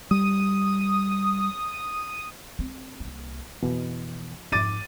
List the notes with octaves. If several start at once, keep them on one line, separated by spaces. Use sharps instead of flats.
G3 D#6
C4
C2 A#3
F2 B2 E3 F3 E4
F2 G#2 D6 A6 D#7